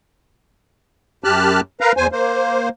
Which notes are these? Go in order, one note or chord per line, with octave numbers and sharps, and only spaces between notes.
F#2 G4 A5 F6 F#6
A#4 B4 F5 A#5
E2 C5 G#5
A#3 C5